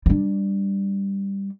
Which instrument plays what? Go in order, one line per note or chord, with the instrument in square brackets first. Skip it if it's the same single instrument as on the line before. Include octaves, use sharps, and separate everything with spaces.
[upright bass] G3 D4